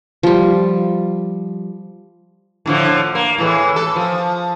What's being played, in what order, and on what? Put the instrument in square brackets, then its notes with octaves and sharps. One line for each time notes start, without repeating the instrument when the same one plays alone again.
[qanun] F3 G3
[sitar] A2 D3 F3
A#3
A2 E3 G#3
A4
F3